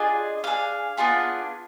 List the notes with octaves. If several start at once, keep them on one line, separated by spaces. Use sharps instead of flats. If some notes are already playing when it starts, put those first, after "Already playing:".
Already playing: D4 F4 G#4 D#5
D4 G#4 F5
B3 D4 F4 G#4